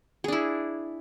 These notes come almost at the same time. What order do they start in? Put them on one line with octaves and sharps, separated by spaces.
G#4 D4 E4